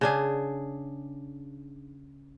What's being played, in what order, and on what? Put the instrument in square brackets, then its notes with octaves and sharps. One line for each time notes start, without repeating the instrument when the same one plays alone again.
[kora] C#3 D4 G#4